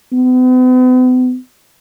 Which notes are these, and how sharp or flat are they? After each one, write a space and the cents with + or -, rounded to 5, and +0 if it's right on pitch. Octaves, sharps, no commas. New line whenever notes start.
B3 +45